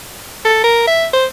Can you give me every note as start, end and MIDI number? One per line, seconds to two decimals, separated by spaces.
0.45 0.60 69
0.64 0.87 70
0.87 1.07 76
1.13 1.26 72